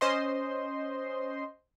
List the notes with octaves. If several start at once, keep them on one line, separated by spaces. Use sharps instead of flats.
C#4 C5 D#5 C6